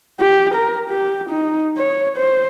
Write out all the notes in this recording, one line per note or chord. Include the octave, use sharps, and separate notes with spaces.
G4
A#4
G4
D#4
C#5
C5